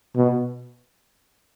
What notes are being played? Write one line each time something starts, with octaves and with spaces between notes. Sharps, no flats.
B2